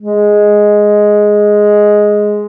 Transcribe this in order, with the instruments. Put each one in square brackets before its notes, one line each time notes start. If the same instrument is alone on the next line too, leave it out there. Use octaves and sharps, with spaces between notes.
[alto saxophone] G#3